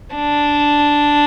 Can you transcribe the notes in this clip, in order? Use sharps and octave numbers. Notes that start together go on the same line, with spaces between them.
D4